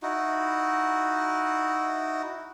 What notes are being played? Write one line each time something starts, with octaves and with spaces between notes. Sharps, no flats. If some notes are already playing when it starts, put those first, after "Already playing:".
D#4 E4 F#4